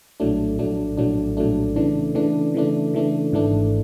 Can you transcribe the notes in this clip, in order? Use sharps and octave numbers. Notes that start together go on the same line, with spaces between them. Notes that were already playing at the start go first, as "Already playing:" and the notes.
A#1 A2 F#3 A3 D4
A#1 A2 F#3 A3 D4
A#1 A2 F#3 A3 D4
A#1 A2 F#3 A3 D4
C#3 E3 A3 D4
C#3 E3 A3 D4
C#3 E3 A3 D4
C#3 E3 A3 D4
G#1 G#2 E3 A3 D4